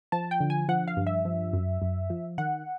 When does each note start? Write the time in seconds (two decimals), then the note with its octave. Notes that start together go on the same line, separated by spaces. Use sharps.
0.12 F3 A5
0.31 G5
0.40 D3
0.50 G#5
0.69 F3 F#5
0.88 F5
0.97 G2
1.07 E5
1.25 F3
1.53 F#2
1.82 F#2
2.10 F3
2.38 D#3 F#5